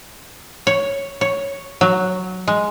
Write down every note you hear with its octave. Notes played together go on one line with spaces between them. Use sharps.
C#5
C#5
F#3
G#3